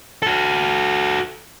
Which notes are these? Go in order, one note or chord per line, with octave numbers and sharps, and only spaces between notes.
F#4 A4